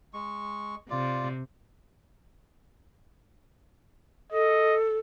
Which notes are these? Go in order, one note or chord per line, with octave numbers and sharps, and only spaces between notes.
G#3 C#6
C3 F4 D5
A4 D#5